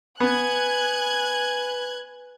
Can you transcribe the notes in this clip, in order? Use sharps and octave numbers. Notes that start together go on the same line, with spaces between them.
B3 B4 G#5 F#6 G#6